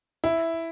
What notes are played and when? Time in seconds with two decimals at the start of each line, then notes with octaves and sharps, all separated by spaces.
0.24 E4